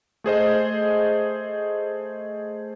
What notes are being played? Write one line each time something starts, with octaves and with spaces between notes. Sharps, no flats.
A3 G#4 C5 D#5